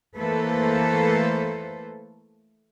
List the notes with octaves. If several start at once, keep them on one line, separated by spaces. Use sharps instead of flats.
E3 A3 A#3 A4 B4 C5